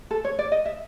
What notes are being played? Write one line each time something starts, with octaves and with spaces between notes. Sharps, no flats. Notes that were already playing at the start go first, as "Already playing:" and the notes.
A4
C#5
D5
D#5
E5